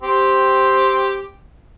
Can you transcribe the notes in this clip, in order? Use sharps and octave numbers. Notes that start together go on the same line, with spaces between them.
C4 G4